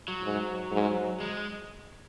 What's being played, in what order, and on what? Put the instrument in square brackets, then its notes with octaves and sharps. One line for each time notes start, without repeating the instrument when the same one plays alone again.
[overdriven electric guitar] F#3
[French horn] G#2
G#2
[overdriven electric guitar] G#3